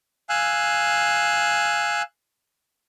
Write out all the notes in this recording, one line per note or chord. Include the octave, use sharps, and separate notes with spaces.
F5 G#5 E6 F#6